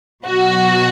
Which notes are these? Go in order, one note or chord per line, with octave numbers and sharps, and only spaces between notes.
B2 F#3 F#4